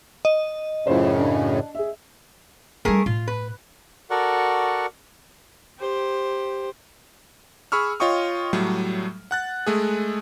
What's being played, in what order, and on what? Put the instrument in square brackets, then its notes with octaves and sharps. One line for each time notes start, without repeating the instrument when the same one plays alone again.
[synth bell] D#5
[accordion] F#2 A2 C#3 [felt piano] E4 F4 C5
[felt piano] D4
G#4 E5
[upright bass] G3 C#4 [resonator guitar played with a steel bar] A3 G#4 A#4
[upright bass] A2 [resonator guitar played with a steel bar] F4
[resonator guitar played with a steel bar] B4
[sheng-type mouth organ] F#4 A4 A#4 D5 F#5 C#6
[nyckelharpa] G4 C5
[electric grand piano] G#4 B5 C#6 E6 F6
F4 C#5 D#5 G5 C#6 D#6
A2 F#3 G3 A3
F#5 F#6 A6
G#3 A3 G#4